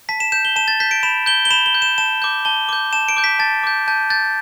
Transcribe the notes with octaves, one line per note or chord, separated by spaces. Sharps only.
A5 B6
E7
G6 E7
G7
A5 E7
A6
G6 B6
D7
B5 E7
G6 G7
G7
B5 E7
G7
G6
E7
A5 E7
D6 G6
A5 G7
D6 G6
A5 E7
D7
D6 G6
B6
A5 A6
D6 G6
A5 G6
G6 A6